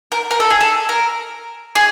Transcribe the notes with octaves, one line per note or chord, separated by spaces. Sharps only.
A#4
A#4
A4
G#4
A4
A#4
G#4